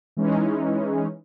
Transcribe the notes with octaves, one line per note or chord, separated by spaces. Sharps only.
E3 G#3 C#4 D#4